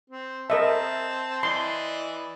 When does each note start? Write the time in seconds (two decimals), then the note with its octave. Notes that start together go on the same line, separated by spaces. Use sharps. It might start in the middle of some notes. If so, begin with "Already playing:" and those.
0.10 C4
0.50 C4 A#4 D#5 E5 A5
1.43 E3 D5 D#5 C6